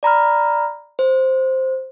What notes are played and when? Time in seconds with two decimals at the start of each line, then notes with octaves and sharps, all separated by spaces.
0.03 D5 A#5 B5 F6
0.99 C5